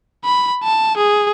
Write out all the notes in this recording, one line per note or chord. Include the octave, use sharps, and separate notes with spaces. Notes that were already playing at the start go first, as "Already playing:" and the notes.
B5
A5
G#4